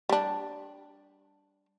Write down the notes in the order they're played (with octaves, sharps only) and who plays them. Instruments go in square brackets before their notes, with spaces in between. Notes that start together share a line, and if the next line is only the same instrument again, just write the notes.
[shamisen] G3 D4